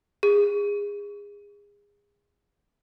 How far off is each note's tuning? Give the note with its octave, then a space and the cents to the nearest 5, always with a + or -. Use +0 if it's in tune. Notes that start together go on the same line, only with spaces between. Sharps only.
G#4 -25